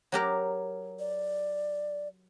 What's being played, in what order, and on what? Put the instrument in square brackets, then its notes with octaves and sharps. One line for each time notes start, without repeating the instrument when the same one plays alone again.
[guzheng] F#3 G4 A#4
[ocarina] D5